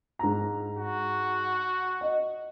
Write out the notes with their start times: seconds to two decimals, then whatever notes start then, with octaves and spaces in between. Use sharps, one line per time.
0.19 G#2 A#5
0.77 F#4
2.01 D#5